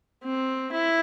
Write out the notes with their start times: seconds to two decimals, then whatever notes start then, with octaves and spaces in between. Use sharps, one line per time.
0.24 C4
0.72 E4